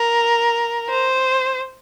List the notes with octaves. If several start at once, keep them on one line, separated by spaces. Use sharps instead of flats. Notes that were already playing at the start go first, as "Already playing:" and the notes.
Already playing: A#4
C5